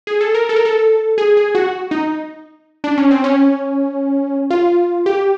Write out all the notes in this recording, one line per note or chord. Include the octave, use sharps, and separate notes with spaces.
G#4
A4
A#4
A4
A#4
A4
G#4
G#4
F#4
D#4
D4
C#4
C4
C#4
F4
G4